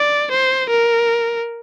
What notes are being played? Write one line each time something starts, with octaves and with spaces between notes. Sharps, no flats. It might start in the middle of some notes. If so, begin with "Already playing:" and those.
Already playing: D5
C5
A#4